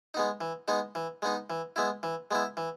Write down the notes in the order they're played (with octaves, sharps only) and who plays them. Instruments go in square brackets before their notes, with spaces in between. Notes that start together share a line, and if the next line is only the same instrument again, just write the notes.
[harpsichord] G#3 B3 D#4
E3
G#3 B3 D#4
E3
G#3 B3 D#4
E3
G#3 B3 E4
E3
G#3 B3 E4
E3